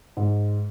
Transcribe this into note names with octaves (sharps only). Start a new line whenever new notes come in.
G#2